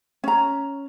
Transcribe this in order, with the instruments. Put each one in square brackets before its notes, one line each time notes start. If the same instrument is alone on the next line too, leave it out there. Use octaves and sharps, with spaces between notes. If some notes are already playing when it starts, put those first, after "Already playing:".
[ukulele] C#4 A#5